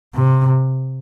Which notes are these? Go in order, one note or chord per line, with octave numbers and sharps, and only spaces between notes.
C3